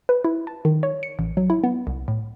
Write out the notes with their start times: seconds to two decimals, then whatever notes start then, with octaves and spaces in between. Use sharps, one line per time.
0.09 B4
0.24 E4
0.47 A5
0.65 D#3
0.83 C#5
1.03 C#7
1.19 A1
1.37 F#3
1.50 E4
1.64 B3
1.87 C2
2.08 A2